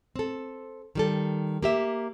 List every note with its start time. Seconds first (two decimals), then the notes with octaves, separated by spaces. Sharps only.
0.16 C4 A4
0.95 D#3 G3 A4
1.62 A#3 G4 E5